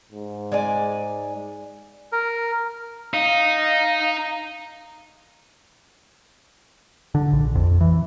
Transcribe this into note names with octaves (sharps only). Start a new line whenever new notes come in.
G#2
G#3 D5 G#5
A#4
D#4 F5
D3
A#1
F2
E3